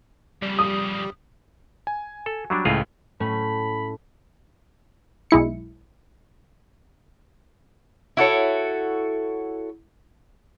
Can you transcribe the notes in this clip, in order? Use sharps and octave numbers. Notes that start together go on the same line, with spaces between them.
F2 C#3 G3
D#6
G#5
A4
F#3 G3 D4
C#2 A2 F4 G#4 A#5
A2 A3 C#4 B5
B1 G#3 E4 C#7
E4 F#4 A4 C#5